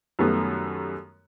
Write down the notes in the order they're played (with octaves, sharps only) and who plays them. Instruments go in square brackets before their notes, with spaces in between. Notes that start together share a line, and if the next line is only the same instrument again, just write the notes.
[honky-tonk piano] F#2 D#3 G3 A3 B3